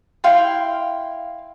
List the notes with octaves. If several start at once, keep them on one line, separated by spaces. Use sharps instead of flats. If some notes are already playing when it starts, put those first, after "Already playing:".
E4 F5 G5 C6